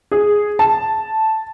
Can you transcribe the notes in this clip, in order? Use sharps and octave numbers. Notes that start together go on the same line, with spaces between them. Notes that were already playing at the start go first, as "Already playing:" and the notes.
G#4
A5